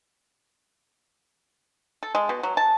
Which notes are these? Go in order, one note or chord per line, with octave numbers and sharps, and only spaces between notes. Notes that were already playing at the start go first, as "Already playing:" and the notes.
A4
G#3
B2
F#3
A5